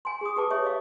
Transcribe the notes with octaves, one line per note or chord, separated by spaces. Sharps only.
G#5 C6
G#4 D#6
G4 G#4 B4 A5 D6
G4 C#5 E5
D#5 F5